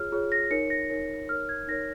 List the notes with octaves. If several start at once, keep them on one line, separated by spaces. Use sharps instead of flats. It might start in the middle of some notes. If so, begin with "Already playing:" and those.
Already playing: F4 G#4 C#5 F6
F4 G#4 C#5
A#6
D#4 A#4 C#5 C#7
A#6
D#4 A#4 C#5
D#4 A#4 C#5 F6
G#6
D#4 A#4 C#5 A#6